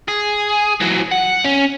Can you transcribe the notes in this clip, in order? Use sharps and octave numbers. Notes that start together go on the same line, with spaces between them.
G#4
E3 F#3
F#5
C#4